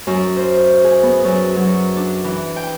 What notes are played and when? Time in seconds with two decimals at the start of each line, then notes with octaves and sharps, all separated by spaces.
0.07 F#2
0.37 C5
0.84 G#4
1.03 B3
1.24 F#2
1.56 F#3
1.96 D4
2.24 E3
2.56 G5